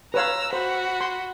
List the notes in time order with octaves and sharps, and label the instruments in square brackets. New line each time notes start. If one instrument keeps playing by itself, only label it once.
[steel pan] B4 C#5 F5 [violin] A#5 E6
[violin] F#4 B5 [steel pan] C5
[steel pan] C6